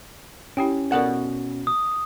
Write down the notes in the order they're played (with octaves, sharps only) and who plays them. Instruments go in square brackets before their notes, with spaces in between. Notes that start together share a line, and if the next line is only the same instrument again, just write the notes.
[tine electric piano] C#4 [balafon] E4 G4 G5
[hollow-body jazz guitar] B2 F#5 [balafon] A4 A#4 D5
[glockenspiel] D#6